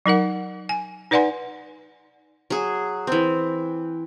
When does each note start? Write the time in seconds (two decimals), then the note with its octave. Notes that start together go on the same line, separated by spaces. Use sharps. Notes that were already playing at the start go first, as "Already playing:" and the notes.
0.06 F#3 D#4 A#4 F#5
0.69 G#5
1.11 D#4 B4 D5 F#5 G#5 C6
2.50 F#3 G#4
3.07 E3 C4